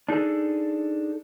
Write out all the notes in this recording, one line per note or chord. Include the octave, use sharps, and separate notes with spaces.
D4 D#4 G#4 A4